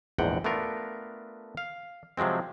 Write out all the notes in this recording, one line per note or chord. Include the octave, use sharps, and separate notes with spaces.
A#1 E2 G#2 D3 F#5 G5
A3 B3 D4 F4 A#4
F5
C3 F3 F#3 G#3 C4